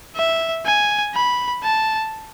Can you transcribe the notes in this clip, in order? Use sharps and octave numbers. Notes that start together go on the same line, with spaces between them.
E5
G#5
B5
A5